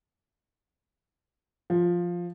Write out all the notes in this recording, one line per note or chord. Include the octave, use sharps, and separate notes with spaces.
F3